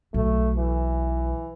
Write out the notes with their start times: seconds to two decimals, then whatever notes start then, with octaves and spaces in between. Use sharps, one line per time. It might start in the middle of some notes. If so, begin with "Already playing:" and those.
0.14 B1 A3
0.57 E3